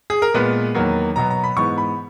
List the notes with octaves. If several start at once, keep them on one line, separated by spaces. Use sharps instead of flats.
G#4
A#4
A#2 G#3 B3 B4
E2 D#3 F#3 A#3
B2 F#3 B3 A#5
A#5
B5
G#2 E3 B3 C#6
B5